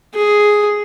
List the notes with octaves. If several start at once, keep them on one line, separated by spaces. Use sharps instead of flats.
G#4